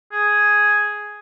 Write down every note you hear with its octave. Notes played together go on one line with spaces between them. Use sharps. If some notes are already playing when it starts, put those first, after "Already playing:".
G#4